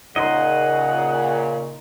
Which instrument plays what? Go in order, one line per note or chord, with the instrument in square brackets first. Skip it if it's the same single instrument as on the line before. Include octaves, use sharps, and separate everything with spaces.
[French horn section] A#2 C#3 [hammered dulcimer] D#4 C6 [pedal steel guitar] D#5 [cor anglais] F#5